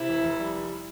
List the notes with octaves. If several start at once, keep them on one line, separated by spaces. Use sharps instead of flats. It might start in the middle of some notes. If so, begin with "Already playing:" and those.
Already playing: C3 E4
F1
F1
G3